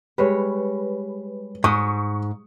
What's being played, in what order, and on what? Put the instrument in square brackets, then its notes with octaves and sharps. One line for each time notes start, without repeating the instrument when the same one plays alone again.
[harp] G3 G#3 C#5 [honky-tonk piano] B4
[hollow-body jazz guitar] G#2 [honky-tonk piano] C#6 [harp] D#6